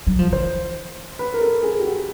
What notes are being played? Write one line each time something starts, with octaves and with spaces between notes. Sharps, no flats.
F#3
F3
E3 C5
B4
A#4
A4
G#4
G4
F#4